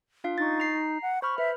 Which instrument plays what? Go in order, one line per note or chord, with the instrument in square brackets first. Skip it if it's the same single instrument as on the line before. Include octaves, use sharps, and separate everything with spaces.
[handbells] D4 F4 F5
[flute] D#4 [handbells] C#6 A6
[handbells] A#5 C7
[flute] F#5
[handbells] C5 B5 F6 [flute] C#6
[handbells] B4 [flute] E5